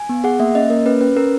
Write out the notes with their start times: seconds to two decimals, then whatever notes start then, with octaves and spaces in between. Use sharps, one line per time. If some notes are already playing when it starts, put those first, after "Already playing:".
Already playing: G#5
0.09 B3
0.24 G#4 F#5
0.40 A#3 E5
0.55 C#4 D#5
0.70 A#3 A#4
0.86 C#4 B4
1.01 C#4 B4
1.16 C#4 A#4